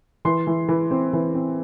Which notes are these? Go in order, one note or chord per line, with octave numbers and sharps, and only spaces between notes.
E3 C6
E3
E3
C4
E3
C4